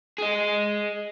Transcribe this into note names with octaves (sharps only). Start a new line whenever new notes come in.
G#4 D#5